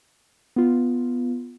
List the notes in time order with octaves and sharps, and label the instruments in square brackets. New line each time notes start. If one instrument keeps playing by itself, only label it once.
[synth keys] B3 F4